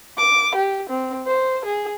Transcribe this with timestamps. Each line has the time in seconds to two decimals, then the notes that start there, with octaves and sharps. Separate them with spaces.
0.18 D6
0.55 G4
0.89 C4
1.27 C5
1.65 G#4